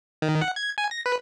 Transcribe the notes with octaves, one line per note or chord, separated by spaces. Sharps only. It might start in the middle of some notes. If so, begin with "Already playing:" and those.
D#3
F#5
G#6
G#5
A#6
B4